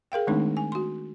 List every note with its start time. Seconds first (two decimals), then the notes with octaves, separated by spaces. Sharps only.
0.12 G#4 A#4 F5 G5
0.27 D#3 G#3 A3 C4 D4 D#4
0.57 G#5
0.72 F#4 C6